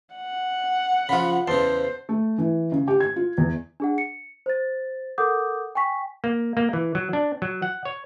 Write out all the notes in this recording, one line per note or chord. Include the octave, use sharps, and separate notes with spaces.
F#5
C#3 F3 F4 B5
E2 C#3 C5 A5 C6
A3
E3
C#3
G4
G#6
F4
E2
D4 G#4 F#5
C#7
C5 A6
A4 A#4 F#5 D6 D#6 G6
G5 G#5 C#6 B6
A#3
A#3
E3
F#3
D4
F#3
F#5
C#5